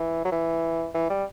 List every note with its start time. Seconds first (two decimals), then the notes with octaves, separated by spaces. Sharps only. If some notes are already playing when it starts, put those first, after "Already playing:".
Already playing: E3
0.25 F#3
0.32 E3
0.94 E3
1.10 G3